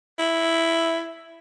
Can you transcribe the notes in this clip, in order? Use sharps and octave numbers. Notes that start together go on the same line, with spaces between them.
E4